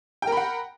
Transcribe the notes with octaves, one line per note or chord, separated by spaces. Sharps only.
A#4 F#5 G5 B5